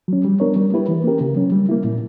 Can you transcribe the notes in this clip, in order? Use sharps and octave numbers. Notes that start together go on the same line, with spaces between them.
F#3 C#4
G3
B3 D4 A#4 C#5
G3
A#3 E4 G4 B4
E3
A#3 C#4 G4 A#4
C#3
F#3 C#4
G3
A#3 E4
A#2